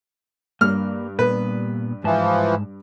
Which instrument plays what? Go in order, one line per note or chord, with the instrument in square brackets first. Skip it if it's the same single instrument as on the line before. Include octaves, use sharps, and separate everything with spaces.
[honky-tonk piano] G2 [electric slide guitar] A#3 [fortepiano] F6
[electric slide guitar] A#2 B3 [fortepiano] B4
[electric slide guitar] G#2 A5 [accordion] E3 F3